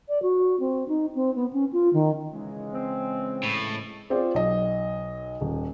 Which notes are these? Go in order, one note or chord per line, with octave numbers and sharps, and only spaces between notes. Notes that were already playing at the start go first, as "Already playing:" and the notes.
D5
F#4
C4
D#4
C4
B3
C#4
F4
D#3
C#3 E3 G#3
C4
A2
C4 F4 G#4 C5 D5
B1 D#5
D#1